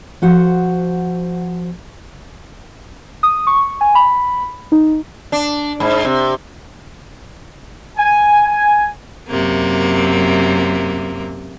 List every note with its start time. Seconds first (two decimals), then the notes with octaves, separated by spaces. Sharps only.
0.22 F3 F#4 C5 F#5
3.23 D#6
3.47 C#6
3.81 G#5
3.95 B5
4.72 D#4
5.32 D4
5.80 G#2
6.05 C3
7.97 G#5
8.47 G#5
9.28 F#2 C3 A#3